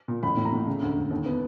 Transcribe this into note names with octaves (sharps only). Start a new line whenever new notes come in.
A#2
A1 B5
A2
A#5
A2
C#3
D2
D2
D#2
B3